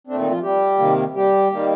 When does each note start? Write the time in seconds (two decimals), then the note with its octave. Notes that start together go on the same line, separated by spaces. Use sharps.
0.07 A#2 A3 C4 D4
0.19 D#3 D#4
0.30 F3 F4
0.42 G3 G4
0.79 C3 D#3 A#3
1.16 G3 G4
1.52 D#3 G3 A#3